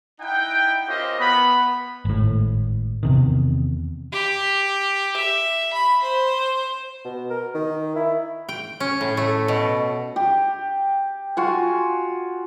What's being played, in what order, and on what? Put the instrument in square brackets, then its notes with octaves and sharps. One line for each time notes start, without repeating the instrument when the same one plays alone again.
[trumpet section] D#4 E4 F#5 G5
C#4 F4 G4 A#4 C5 D#5
B3 B5
[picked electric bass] G#1 A2
E2 C3 D#3
[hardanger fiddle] G4
E5
B5
C5
[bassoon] B2
A#4
D#3
E4
[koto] G5
C#4
A2
A3
B2
[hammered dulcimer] G4
F4 F#4 G#5